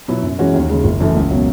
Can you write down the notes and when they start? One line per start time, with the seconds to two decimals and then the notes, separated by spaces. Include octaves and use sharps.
0.08 B2 F#3 B3 E4
0.23 F#2
0.39 E3 G#3 C#4 F#4
0.54 D#2
0.70 C#3 G#3
0.84 F#1
1.00 F#2 E3 A3
1.16 C#2
1.31 B2 F#3